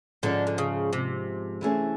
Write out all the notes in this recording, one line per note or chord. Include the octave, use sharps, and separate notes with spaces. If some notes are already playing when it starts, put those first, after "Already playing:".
G#2 D3 F3 G#3 C#4
D3
C#3
C3
E3 A3 C#4 E4 G#4